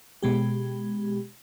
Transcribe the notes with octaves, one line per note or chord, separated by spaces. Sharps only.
B2 G#3 G4